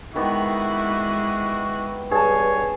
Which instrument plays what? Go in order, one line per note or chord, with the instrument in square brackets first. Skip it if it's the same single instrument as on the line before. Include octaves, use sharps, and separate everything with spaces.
[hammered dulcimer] D#3 B3 G4 [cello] G#3 E4 [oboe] F#4
[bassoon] G2 [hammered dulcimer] G#4 A5 [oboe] C#5